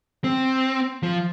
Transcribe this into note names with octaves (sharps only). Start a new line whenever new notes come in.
C4
F3